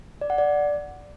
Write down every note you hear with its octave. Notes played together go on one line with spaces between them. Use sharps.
D5
F#5
D5